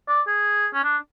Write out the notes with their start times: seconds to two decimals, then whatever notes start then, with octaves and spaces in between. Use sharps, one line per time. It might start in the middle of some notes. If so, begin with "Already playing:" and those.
0.08 D5
0.28 G#4
0.74 C#4
0.84 D4